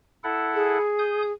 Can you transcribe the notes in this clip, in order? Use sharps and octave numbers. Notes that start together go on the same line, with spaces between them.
E4 A4 F#5
G#4
D#6 G6